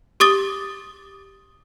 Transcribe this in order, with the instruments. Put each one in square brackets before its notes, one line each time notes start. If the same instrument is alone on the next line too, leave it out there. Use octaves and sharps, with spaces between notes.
[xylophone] G4 D6 D#6 A6 G7